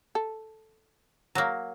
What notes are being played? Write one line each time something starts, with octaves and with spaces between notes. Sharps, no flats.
A4
F#3 A#3